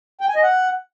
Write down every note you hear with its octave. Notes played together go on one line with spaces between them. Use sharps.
G5
G#5
D#5
F#5